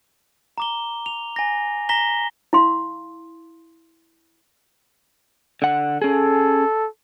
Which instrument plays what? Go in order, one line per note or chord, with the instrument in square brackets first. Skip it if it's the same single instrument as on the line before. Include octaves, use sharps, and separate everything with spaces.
[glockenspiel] A#5 D6 G7
F7
G#5 A#6
A#5 A#6 B6 G7
[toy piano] E4 F5 C6
[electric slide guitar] D3 F#5
[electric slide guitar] C#4 G#4 [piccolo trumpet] A4